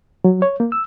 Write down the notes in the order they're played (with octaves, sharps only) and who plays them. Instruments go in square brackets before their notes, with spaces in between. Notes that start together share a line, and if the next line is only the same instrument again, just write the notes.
[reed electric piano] F#3
C#5
A#3
E6